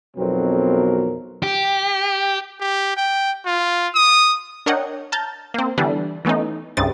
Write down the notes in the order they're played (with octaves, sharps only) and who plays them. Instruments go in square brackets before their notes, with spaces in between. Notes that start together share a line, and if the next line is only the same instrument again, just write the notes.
[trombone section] B1 F2 B2 F#3 C4 A#4
[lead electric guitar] G4
[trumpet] G4
G5
F4
D#6
[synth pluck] D4 A#4 C#5 D#5 F#5 G5
A5 A#5 F6 G6 A6
A#3 C4
D3 E3 G3 B3 D4
E3 A3 B3 C#4 D#4
C2 G2 C#3 C4 D#5 A6